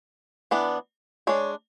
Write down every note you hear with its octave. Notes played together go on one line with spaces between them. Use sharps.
E3 B3 D4
G#3 D4 C#5